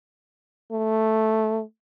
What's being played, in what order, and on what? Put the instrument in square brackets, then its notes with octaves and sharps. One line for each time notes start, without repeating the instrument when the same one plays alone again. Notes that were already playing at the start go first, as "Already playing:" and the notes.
[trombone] A3